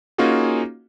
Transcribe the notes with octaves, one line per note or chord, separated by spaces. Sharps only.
A#3 C#4 D#4 F4 F#4 G#4